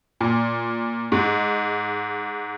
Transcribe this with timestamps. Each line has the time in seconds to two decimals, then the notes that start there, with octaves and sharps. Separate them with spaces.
0.21 A#2
1.12 G#2